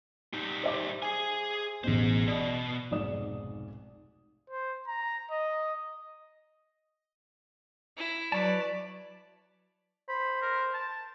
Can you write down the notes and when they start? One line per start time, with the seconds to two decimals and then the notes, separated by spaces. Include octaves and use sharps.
0.33 G3 D#4
0.64 C5 E5 D6
1.02 G#4 G#5
1.84 A1 B2 G#4 C5
2.28 B2 D5 D#5
2.91 F1 B1 G#2 D5 D#6 E7
4.50 C5
4.88 A#5
5.31 D#5
7.97 E4
8.32 F#3 B4 C#5 D5 A5
10.09 C5 B5
10.42 A#4
10.74 A5